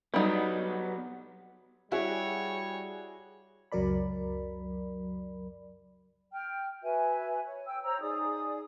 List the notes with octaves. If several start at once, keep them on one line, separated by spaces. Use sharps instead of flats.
F#3 G3 B3 D#4
G3 E4 F#4 G#4 C#5
C#2 F#2 F#3 A#4 D5 B5
G5 F6
F#4 B4 E5 G#5
C#5
G5 E6
C5 C#5 A#5 E6
D#4 G#4 D5 D#6